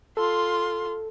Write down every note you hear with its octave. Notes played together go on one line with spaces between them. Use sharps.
F4 A4 C6